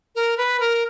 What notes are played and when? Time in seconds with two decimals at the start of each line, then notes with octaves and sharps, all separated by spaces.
0.15 A#4
0.37 B4
0.60 A#4